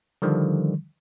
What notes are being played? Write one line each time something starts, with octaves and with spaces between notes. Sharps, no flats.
D3 D#3 F3 G3